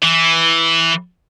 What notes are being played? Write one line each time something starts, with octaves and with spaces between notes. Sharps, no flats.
E3